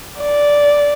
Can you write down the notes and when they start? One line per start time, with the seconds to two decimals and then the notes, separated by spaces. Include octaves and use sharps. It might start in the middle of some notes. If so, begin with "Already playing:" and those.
0.21 D5